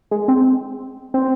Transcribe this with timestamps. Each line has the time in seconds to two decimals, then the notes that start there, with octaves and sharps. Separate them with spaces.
0.11 G#3
0.28 C4
1.14 C4